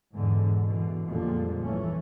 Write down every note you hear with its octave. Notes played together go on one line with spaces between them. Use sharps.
E2 G#2 B2 D3
B2 D3 E3
F2 A#2 D3 F3 G3 G#3
F1 E3 A3 C#4